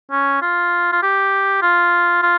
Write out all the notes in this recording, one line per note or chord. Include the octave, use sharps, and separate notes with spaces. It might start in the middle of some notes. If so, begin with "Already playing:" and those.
C#4
F4
F4
G4
F4
F4